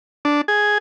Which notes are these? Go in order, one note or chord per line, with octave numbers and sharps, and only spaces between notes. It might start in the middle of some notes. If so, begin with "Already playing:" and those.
D4
G#4